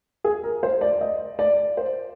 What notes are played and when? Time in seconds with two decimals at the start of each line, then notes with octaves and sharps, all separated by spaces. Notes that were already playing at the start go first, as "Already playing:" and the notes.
0.24 G#4
0.44 A#4
0.63 C5
0.81 D5
1.01 D#5
1.39 D5
1.77 C5